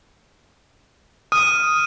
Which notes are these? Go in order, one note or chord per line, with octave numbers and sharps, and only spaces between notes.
D#6 F6 D#7